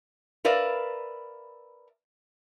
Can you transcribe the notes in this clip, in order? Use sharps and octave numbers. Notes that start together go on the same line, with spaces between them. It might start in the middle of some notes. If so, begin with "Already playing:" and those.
A#4 B4 D5 E5 F5